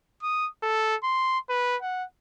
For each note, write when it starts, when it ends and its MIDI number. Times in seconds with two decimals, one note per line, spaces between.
0.22 0.48 87
0.63 0.96 69
1.04 1.39 84
1.49 1.77 71
1.82 2.05 78